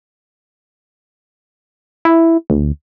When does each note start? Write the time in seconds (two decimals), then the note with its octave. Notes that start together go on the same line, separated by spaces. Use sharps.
2.05 E4
2.50 D2